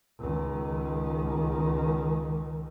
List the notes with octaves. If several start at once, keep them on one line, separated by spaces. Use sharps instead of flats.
C#2 D#3